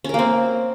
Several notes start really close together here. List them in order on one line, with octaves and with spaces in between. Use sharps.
C#4 A#4 A#3 C4